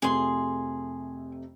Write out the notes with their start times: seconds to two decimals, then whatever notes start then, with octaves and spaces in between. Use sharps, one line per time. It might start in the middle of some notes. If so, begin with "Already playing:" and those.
0.02 F2 C3 A3 G#4 C6